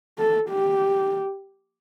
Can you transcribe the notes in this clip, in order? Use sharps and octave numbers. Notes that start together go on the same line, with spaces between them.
A4
G4